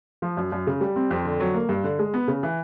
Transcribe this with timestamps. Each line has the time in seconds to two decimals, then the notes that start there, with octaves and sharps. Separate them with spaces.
0.22 F3
0.37 F#2
0.52 F#2
0.67 C#3
0.81 G3
0.96 C4
1.11 F2
1.25 D3
1.40 F#3
1.54 A#3
1.69 G2
1.84 D3
1.99 G#3
2.14 B3
2.28 C#3
2.43 E3